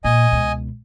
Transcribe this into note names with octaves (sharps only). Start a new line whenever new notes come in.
A#2 D#5 G#5
C#2 B2